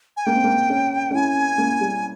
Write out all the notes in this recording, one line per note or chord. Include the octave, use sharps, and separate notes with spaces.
G#5
A#3 G5
C4
A#3
C#4
C#4
E4 G#5
A#3
G3